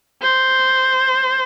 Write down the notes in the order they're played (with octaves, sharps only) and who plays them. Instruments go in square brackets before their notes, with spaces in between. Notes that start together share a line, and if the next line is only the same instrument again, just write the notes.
[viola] C5